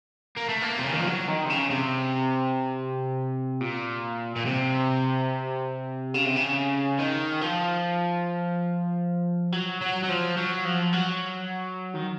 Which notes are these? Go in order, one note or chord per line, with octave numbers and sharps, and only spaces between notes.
A#3
A3
A#3
C3
C#3
D#3
F3
F#3
D#3
C3
C#3
C3
A#2
A#2
C3
C#3
C3
C#3
D#3
F3
F#3
F#3
F#3
F3
F#3
F3
F#3
D#3